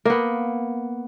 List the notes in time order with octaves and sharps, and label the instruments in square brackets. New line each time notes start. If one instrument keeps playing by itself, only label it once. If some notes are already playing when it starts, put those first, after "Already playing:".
[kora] A#3 B3